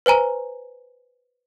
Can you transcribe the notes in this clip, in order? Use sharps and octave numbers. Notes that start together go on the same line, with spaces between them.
B4 C5 G#5 A#5